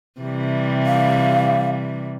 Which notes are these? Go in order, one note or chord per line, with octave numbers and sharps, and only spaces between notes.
C3 E3 G3
F5